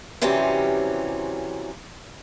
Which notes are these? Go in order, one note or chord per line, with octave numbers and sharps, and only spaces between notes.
C3 E3 F#3 G3 C4 C#4